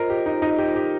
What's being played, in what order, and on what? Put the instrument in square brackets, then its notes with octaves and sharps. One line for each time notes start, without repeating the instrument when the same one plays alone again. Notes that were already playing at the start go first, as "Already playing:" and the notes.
Already playing: [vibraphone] F4 C5 D#5 [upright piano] A#4
[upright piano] G4
D#4
[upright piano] D#4 [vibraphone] F4 C5 D#5
[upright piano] G4
G4